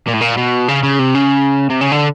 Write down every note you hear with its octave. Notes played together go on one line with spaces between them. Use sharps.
A#2
A2
A#2
B2
C#3
C#3
C3
C#3
C3
C#3
D3